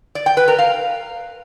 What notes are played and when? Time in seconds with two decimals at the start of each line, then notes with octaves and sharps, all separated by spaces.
0.15 D5
0.26 G5
0.37 B4
0.48 A#4
0.59 F5